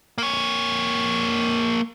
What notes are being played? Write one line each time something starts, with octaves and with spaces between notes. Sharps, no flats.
A#3 C#5